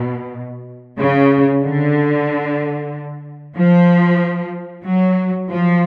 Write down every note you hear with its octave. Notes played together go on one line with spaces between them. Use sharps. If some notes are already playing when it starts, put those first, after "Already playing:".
Already playing: B2
C#3
D3
F3
F#3
F3